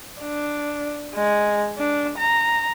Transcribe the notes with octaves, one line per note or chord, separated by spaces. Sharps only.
D4
G#3
D4
A#5